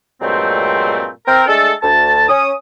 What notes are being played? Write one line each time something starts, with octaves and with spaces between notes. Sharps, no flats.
G2 A#2 F#3 G#3 A3 C4
C4 A#4
G#3 A3 D4 G#4 A4
D2 A5
C#4 D#6